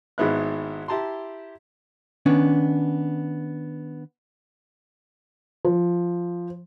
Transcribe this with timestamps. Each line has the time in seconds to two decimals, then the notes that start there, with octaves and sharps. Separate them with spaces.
0.18 G#1 G#2 G#3 B3 E4 F#6
0.88 E4 G4 A5 A#5 C6
2.26 D#3 B3 C#4 D4
5.65 F3